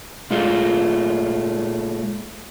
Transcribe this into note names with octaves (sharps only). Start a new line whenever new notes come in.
A#2 G#3 A3 F4